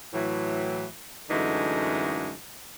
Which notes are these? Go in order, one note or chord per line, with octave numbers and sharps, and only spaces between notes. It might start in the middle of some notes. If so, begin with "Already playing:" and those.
A2 E3 F#3
F#2 D3 E3 G#3 A3 D#4